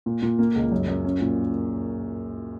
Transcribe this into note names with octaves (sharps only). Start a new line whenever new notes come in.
A#2
A#2
A#3
C#2
F#2
F#2
C#4
A#2